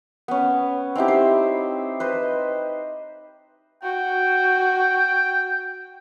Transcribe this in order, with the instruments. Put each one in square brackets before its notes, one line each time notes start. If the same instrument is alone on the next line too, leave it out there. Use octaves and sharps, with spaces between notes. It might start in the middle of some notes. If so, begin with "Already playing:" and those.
[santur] B3 C#4
C4 D#4 E4 G4
C5
B4 C5 D#5
[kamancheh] F#4 [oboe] G5